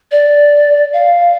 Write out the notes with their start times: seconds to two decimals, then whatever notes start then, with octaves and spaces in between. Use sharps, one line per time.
0.12 D5
0.93 F5